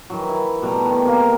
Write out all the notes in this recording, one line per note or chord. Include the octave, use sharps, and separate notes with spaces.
D#3 E3 F#3
E4
B2 G3 A3 A#5
B2 D#3
C3 A#3